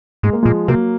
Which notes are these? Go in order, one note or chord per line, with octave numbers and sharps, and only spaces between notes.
G#2 G#3
A#3
A#2 F3 G#3
C3 F#3 A#3